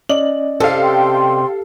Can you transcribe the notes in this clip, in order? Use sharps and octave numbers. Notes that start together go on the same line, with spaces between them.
C#4 D5 D#5 F#7
C3 A4 F5
G5 C6